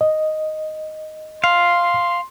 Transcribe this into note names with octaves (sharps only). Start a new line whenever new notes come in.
D#5
F5 C6